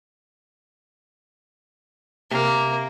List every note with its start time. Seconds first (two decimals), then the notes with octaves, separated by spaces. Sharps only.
2.31 C3 A#3 F5